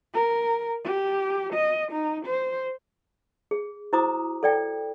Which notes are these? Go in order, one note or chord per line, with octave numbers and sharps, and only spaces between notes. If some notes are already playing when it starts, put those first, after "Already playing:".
A#4
G4
D#5
D#4
C5
G#4
E4 F#4 C5 A#5 D6 D#6
A4 D5 G5